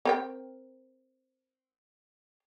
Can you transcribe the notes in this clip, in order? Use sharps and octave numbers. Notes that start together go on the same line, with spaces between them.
C4 A#4 G5